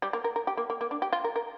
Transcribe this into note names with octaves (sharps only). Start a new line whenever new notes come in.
G3
A#3
A#4
A#4
G4
A#3
A#3
A#3
D4
G4
F4
A#4
A#4